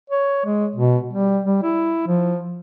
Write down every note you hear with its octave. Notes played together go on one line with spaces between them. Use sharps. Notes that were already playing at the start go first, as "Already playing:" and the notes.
C#5
G#3
B2
G3
G3
E4
F3